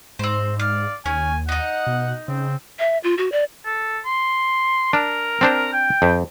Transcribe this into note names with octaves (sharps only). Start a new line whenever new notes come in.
G#2 C4 C5
D5 F5
D#2 C#4 G#5
D#4 D#5 F#5
B2
C#3 C4
E5
F4
F#4
D5
A4
C6
D4 A#4
C4 D4 C5
G5
F2